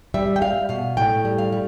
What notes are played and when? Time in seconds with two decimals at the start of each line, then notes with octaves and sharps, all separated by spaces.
0.14 G3 E5
0.36 G5
0.42 G3 F5
0.69 B2 F5
0.97 A2 G5
1.25 G3
1.38 F5
1.52 G3